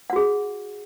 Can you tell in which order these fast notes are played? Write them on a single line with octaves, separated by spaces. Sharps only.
F#5 F#4 G#4